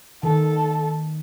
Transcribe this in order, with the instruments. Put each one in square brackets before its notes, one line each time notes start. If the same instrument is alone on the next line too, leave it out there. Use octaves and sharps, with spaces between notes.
[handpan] D#3 [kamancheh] A4